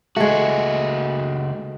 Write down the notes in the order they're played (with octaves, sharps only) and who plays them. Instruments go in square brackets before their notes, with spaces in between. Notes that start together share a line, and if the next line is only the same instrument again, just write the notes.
[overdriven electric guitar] C#2 F#4 [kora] G#3 A3